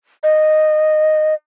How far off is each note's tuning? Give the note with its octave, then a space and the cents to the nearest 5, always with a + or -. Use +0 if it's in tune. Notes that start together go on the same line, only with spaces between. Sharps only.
D#5 -10